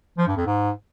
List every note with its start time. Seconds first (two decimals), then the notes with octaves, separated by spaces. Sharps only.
0.18 F3
0.27 G2
0.36 F2
0.46 G#2